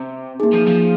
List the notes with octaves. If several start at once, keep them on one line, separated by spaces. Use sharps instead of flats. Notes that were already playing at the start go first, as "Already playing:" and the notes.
Already playing: C3
A#3 D#4 G#4
F3
F3